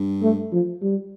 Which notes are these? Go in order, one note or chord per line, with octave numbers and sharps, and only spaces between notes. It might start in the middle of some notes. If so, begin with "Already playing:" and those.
Already playing: G2
A3
F3
G3